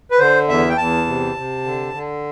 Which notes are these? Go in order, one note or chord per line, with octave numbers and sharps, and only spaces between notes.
B4
D3 C5
E2 E5
G5
E2 A5
C3
C3
D3
D3